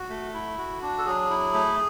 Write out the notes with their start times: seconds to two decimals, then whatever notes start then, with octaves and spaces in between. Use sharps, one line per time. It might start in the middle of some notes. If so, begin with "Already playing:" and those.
Already playing: F#4
0.10 A3
0.34 E4
0.58 F#4
0.82 D4
0.98 A4
1.06 F#3 G#4
1.30 E4
1.54 A3